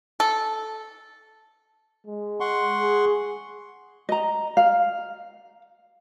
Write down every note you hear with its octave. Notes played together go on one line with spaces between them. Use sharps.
A4
G#3
F#5 C6 C#6
G#4
D#5 A#5
F5